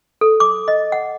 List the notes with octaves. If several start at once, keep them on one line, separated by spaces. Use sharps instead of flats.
A4
D6
D#5
F#5